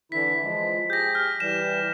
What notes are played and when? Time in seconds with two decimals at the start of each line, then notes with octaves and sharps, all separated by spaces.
0.12 D3 E3 E4 B6
0.43 F3 G#3
0.90 G4 G#4 G6 A#6
1.15 F6
1.40 E3 G3 E7